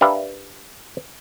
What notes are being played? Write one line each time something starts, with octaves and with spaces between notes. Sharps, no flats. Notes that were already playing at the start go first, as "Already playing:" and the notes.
D4 G4 A#4 B4 E5 F5